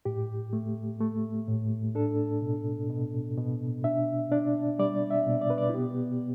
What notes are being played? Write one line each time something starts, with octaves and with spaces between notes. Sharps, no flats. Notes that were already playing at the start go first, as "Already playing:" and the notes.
A2 G4
A3
A3
A2
D4 A4
B2
B2
B2
D4 E5
D4 D5
G3 D5
E5
B2
D5
B4
D5
E4
B3 G4